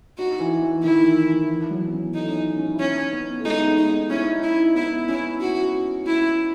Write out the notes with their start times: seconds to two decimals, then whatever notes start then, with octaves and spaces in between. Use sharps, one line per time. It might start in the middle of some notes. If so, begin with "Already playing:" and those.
0.18 D#4 F#4
0.40 E3
0.62 E3
0.84 D#3 E4
1.05 E3
1.28 E3
1.49 E3
1.70 F#3
1.88 B3
1.93 C#4
2.14 A3 D#4
2.29 C#4
2.37 D#4
2.57 C#4
2.75 E4
2.79 C#4 D#4
3.12 B3
3.40 A3
3.45 G#3 D#4
3.56 A3
3.67 B3
3.78 D#4
3.89 D#4
4.10 C#4 E4
4.33 D#4
4.43 E4
4.75 B3 E4
5.08 C#4 E4
5.41 F#4
6.06 E4